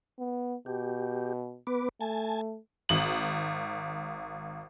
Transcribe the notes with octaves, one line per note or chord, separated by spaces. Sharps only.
B3
B2 G4
B3 B4 D6
A3 G#5 A5
G#1 F#7